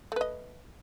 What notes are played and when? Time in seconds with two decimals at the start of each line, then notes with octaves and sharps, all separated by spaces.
0.12 A3
0.16 B4
0.21 D#5